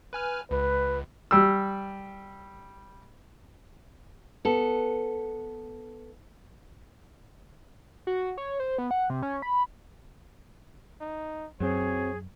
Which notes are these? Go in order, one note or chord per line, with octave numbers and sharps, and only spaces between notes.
B4 G#5 F6
C#2 B4
G3 E6
B3 A4
F#4
C#5
C5
B3
F#5
C3
C#4
B5
D#4
F#2 F#3 C4 G#4 C#5